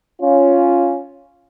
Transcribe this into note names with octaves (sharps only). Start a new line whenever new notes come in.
C#4 F4